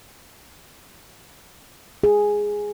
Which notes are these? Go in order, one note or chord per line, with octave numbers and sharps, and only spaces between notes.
G#4